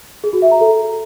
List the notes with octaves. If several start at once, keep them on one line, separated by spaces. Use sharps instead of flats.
G#4
F#4
E5
A#5
A4